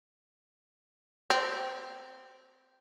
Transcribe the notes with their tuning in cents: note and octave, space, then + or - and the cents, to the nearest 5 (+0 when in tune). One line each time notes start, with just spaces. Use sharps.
C4 -10